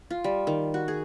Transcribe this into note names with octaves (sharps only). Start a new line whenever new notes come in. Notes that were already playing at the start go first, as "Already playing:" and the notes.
F4
G3
D#3
F#4
G#4